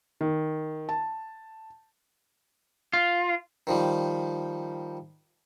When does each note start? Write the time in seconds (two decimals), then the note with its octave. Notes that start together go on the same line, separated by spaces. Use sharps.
0.21 D#3
0.89 A5
2.93 F4
3.67 D#3 F3 G3